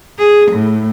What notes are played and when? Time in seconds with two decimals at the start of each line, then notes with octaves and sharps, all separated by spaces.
0.18 G#4
0.52 A2